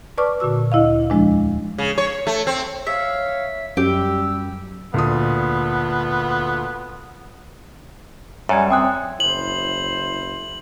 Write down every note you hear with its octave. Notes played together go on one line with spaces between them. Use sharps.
B4 D5 A5 C#6 D6 F6
A#2 D3 F#4 E6
D2 E4 D#5 F5
E2 F3 G#3 D4
C#3
C#5
A3
C4
C#5 E5 F5
F#2 G3 G4 E6
D2 A#2 B3 D#6
F#2 G3 E5 G#5 G#6
C4 G5 D#6 F#6
F#1 E4 C5 F#7